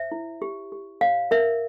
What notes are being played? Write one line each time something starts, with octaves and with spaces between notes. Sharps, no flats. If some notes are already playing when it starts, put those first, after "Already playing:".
Already playing: C5 E5
E4
G4
G4
C#5 F5
A#4 E5